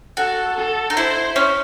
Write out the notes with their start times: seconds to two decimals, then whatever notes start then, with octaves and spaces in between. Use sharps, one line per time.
0.17 F#4 A4
0.57 A4
0.90 D#4
0.97 E4 C5
1.36 C#4